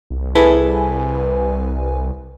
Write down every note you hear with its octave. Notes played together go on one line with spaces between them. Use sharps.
C2
E4 G#4 A4 B4 G#5